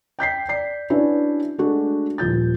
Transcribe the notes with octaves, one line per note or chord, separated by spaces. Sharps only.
G5 G6 B6 C7
D5 C7
C#4 D4 E4 F#4 B4 D5
G#3 A3 D4 F#4 A4
D#1 F3 G6 A6